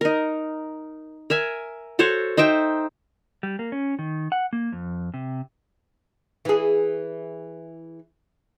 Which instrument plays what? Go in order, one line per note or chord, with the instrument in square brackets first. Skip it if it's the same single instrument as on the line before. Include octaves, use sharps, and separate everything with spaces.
[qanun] D#4 A#4
A#4 E5 G#5
F#4 A4 C5 C#5
D#4 C5 E5 G5
[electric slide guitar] G3
A#3
C#4
D#3
F#5
A#3
F2
C3
[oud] E3 G#4